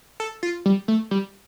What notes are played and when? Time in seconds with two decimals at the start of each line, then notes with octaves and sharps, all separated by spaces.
0.20 A4
0.43 F4
0.66 G3
0.88 A3
1.11 G3